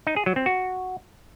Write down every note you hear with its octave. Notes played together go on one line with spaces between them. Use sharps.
D#4
G#4
F#3
C4
F#4